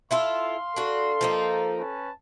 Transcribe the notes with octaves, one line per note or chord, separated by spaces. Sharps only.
E4 F4 A4 F5 C6
D4 F#4 A4
F3 A#3 D#4
C#4 B4 A5